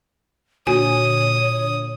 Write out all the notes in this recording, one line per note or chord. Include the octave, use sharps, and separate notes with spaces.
A#2 D3 F#4 C#5 G#5 D#6